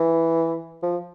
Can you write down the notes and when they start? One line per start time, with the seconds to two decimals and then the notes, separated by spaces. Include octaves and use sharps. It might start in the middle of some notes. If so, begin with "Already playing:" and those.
Already playing: E3
0.83 F3